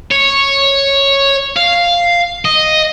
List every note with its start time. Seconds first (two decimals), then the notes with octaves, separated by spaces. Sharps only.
0.11 C#5
1.56 F5
2.45 D#5